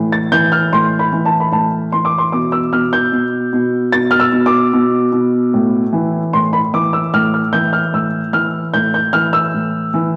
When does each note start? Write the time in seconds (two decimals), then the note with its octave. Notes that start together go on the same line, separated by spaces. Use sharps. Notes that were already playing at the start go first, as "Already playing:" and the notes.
Already playing: A2 E3
0.12 A6
0.32 E3 G6
0.52 F6
0.72 A2 C6
0.99 B5
1.12 E3
1.25 A5
1.40 B5
1.52 A2 A5
1.92 E3 C6
2.05 D6
2.18 C6
2.32 B2 D6
2.52 E6
2.73 B2 F6
2.93 G6
3.12 B2
3.53 B2
3.92 B2 A6
4.11 F6
4.20 E6
4.32 B2
4.46 D6
4.73 B2
5.12 B2
5.54 A2
5.93 E3
6.33 A2 C6
6.53 B5
6.74 E3 D6
6.93 E6
7.13 A2 F6
7.34 F6
7.53 E3 G6
7.73 F6
7.93 A2 E6
8.33 E3 F6
8.74 A2 G6
8.94 G6
9.13 E3 F6
9.33 E6
9.54 A2
9.94 E3